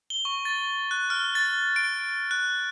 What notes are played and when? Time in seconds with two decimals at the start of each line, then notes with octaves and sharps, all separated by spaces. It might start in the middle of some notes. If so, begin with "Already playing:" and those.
0.10 G7
0.25 C#6
0.45 A6
0.91 F#6
1.10 F6
1.35 A6
1.76 D7
2.31 F#6